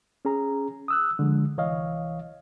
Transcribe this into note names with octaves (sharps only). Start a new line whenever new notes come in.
C#4 G#4 A#5
D#6 E6 F#6
D3 F3 G#3
C2 E3 C#5 D#5 F5